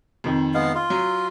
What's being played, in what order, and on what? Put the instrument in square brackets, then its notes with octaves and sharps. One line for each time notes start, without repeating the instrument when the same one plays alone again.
[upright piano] F2 D#3
[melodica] G#3 B3 F5
F4
[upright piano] F#3